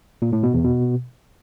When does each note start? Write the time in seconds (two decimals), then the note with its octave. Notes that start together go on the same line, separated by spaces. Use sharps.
0.22 A#2
0.33 A2
0.43 B2
0.54 E2
0.65 B2